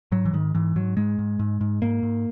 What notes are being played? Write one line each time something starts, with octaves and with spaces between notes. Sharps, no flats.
G#2 F#3
E3
G#2 D#3
G#2 E3
G#2 F#3
G#2 G#3
G#2
G#2
G#2
G#2 A#3
G#2